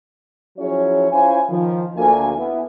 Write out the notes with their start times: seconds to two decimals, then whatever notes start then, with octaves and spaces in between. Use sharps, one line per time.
0.58 F3 F#3 C#4 E4 G#4 C#5
1.11 C#4 E4 F4 C5 F5 G#5
1.49 D#3 F3
1.96 D2 A#3 G#5
2.37 B3 E4